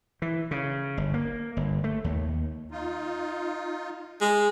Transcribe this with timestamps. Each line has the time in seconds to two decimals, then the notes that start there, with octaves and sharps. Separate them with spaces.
0.22 E3
0.51 C#3
0.97 G1
1.14 A#3
1.57 G1
1.84 A3
2.04 D#2
2.71 D#4 F4
4.21 G#3